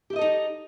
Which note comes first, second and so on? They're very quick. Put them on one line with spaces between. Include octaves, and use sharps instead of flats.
G4 E4 D#5 A4 D#4